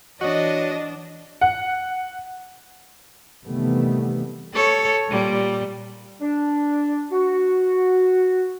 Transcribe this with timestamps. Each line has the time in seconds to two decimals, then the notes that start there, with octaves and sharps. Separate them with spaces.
0.21 E3 D4 F#4 C#5 D#5
1.41 F#5
3.46 C3 D#3 E3 G3 A3 B3
4.54 A4 C#5
5.08 A#2 G3
6.21 D4
7.12 F#4